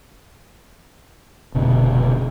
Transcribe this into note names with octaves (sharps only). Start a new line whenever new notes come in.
F1 B2 D3